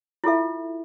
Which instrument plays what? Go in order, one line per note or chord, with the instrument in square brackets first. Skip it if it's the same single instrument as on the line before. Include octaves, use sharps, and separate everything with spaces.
[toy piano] E4 F4 A4 E5